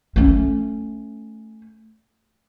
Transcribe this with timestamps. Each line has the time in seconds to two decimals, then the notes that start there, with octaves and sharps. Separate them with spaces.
0.16 A3 C#4